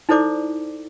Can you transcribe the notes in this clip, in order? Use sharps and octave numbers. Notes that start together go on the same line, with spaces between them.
D#4 E4 A4 C5 D5 D6